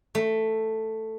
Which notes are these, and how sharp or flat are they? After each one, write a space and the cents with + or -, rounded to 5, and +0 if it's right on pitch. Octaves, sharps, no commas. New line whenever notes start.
A3 +5